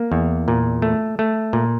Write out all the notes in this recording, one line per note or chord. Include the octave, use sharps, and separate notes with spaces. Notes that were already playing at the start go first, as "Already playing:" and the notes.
Already playing: A#3
E2
A#2
A3
A3
A#2